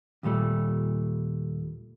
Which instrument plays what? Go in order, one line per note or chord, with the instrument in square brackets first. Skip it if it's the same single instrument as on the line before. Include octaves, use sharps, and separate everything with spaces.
[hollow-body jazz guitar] D#2 A#2 G3 A3